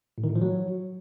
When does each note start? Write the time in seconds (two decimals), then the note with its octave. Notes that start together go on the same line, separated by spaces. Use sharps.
0.18 A2
0.24 D#3
0.30 A2
0.35 F3
0.41 F#3